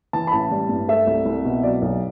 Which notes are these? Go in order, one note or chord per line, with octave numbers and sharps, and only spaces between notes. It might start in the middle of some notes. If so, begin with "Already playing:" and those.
E3 A5
B5
A1 A5
G3
G2
A3 E5
C2
C2
B2
F#3 D5
B1